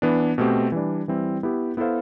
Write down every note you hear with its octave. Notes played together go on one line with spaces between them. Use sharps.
E3 B3 D4
B2 A3 C4 G4
E3 G3 D4
E3 G3 C4 E4
B3 E4 G4
B3 E4 A4 C5 F5